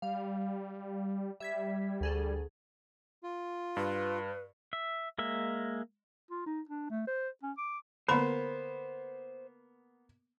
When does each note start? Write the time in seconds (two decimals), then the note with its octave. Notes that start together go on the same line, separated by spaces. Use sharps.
0.02 G3 F5
1.40 G3 E5 G#6 B6
2.01 D2 G#4 A4
3.23 F4
3.77 G2 B4
4.73 E5
5.18 G#3 A#3 E5
6.31 F4
6.46 D#4
6.69 D4
6.90 A3
7.07 C5
7.43 C#4
7.57 D6
8.08 D3 A#3 B3 A#4 C5 B5 C6